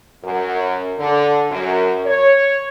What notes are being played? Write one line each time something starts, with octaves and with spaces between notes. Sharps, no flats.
F#2
D3
F#2
C#5